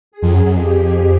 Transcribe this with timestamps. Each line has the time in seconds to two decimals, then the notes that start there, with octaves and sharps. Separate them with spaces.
0.12 G#4
0.22 F2
0.33 F#2
0.45 F#2
0.55 F2 G4